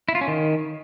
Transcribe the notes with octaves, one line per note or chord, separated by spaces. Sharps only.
E4
F4
C#4
D#3